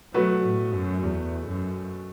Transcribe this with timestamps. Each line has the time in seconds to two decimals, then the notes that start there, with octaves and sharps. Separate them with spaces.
0.14 B2 F#3 A3 F#4 B4
0.44 A2
0.73 F#2
1.03 E2
1.47 F#2